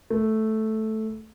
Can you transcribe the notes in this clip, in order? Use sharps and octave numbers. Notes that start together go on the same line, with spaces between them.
A3